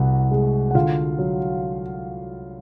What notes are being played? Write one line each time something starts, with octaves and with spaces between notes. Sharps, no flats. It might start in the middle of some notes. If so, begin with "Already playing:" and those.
Already playing: C2 F#4
G#3
F#5
D3 F4 F5
F#3